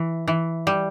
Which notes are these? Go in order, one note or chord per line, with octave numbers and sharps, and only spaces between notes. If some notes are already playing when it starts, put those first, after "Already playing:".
Already playing: E3
E3
G3